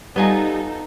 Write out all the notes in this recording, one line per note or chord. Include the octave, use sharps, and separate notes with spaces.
G3 B3 D#4 F4 A4 D#5 G#5 A#5